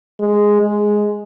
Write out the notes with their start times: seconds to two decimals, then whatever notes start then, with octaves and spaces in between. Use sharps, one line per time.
0.20 G#3
0.61 G#3